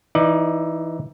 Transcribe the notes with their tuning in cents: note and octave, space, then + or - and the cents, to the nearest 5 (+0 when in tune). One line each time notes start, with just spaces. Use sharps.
E3 +0 D#4 +15 D5 +25